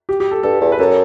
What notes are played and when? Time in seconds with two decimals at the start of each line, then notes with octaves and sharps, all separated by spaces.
0.09 G4
0.20 G4
0.31 A4
0.43 G2 A4
0.61 E2
0.72 B4
0.79 F#2 A4